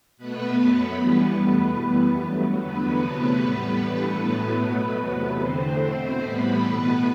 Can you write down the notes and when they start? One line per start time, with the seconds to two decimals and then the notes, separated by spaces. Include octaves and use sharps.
0.17 B2 A3 B3 B4
0.57 F#2 F#3 A3
0.99 G2 E3 G3
1.38 E2 B2 A3 B3 B4
1.78 F#2 E3 G3
2.18 G2 F#3 A3
2.58 E2 D3 F#3 B3 B4
2.99 E2 C3 F#3 A3
3.39 A2 G3
3.79 G2 E3 A3
4.19 A2 F#3 A3 B3 B4
4.60 B2 F#3 A3 B3 B4
5.00 E2 C3 F#3 A3 B3 B4
5.40 E2 D3 A3 C4 C5
5.80 B2 A3
6.20 A2 E3 G3 B3 B4
6.60 B2 A3